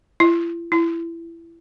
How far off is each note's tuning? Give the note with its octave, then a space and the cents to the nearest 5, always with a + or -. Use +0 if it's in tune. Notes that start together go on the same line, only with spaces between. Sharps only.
E4 +40
E4 +20